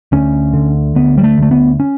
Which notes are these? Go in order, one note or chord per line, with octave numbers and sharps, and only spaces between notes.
D2 C#4
D3
D2 B3
G3
A3
D2 A3
B3
C#4